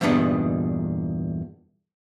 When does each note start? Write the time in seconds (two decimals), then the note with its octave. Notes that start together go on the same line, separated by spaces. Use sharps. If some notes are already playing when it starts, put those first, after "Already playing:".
0.01 E2 G2 A#2 B3 D4 D#4